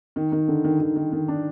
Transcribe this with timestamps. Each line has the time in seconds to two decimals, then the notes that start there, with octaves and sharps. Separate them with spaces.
0.16 D#3
0.32 D#3
0.48 D3
0.64 D#3
0.80 D#3
0.96 D#3
1.13 D#3
1.28 D4